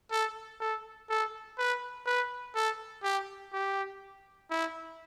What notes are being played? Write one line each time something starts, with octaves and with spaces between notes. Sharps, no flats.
A4
A4
A4
B4
B4
A4
G4
G4
E4